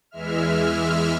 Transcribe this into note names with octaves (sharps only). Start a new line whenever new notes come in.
E2 E3 G#3 E5 F6